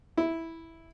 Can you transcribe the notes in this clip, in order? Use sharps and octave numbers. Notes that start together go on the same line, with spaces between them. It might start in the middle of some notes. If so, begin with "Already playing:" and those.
E4